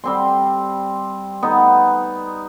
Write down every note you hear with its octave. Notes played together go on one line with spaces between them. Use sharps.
G3 C4 C6
B3 D#4